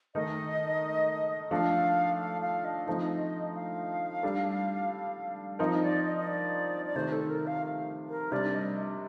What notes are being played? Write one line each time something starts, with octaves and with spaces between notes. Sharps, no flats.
D#3 A3 D#4 A#4 D#5
F3 A3 D4 A4 F5
F5
F5
D#5
F3 A3 C4 D#4
F5
G3 D4 A4
F3 C4 D#4 A#4 D#5
D5
D#5
D#5
D5
D5
C3 D#3 A3 C5
A4
A#4
F5
A#4
C3 G3 D4 D5
D#5